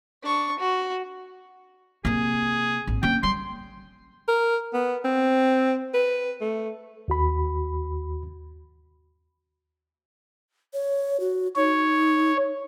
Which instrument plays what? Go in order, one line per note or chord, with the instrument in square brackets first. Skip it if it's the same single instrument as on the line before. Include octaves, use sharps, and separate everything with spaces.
[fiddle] D4 C#6
F#4
[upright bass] C3 A#3 [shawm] G#4
[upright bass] G#1
[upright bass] A#3 C#4 [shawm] G5
[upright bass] G3 [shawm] C6
[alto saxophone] A#4
B3
C4
B4
A3
[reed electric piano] D#2 F#4 B5
[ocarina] C#5
F#4
[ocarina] D#4 [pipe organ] C#5